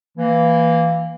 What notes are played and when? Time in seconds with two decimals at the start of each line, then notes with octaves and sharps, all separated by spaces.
0.17 E3 A#3